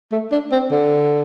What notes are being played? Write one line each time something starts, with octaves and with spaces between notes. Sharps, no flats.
A3
D4
C4
D3